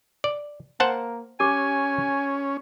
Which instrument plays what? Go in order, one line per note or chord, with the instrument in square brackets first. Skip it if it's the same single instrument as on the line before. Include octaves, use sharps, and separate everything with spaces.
[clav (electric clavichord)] D5
[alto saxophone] A#3 [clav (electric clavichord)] C5 F#5 A5
[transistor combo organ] C#4 [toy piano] G4 D6 [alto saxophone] G#5